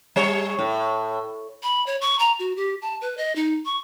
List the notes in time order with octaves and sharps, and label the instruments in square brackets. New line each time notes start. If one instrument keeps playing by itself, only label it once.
[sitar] G3 C#5
A2
[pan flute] B5
C#5
C#6
A#5
F#4
G4
A5
B4
D#5
D#4
C#6